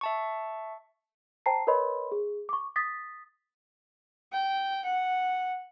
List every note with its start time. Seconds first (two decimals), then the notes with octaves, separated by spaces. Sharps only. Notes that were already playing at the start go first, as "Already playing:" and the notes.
0.01 E5 A5 C#6
1.46 C5 G5 A5 A#5 C7
1.67 A#4 B4 C#5 D#5 B5 C6
2.12 G#4
2.49 C#6 D6
2.76 D#6 A6 B6
4.32 G5
4.84 F#5